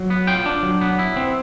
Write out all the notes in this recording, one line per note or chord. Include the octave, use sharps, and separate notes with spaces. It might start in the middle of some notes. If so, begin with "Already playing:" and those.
Already playing: F#3
B3
F4 G5
D4
F#3
B3
E4
C4